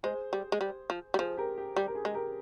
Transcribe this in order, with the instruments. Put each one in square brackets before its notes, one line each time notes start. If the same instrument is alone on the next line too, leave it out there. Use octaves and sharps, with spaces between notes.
[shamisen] G#3 [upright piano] G#4 C5
[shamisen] G3
G#3
G3
F3
G3
[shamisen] F3 [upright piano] G#4 C5
[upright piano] G4 A#4
G4
[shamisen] G3 [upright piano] G4
[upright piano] A#4
G#4
[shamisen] G#3
[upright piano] G4 A#4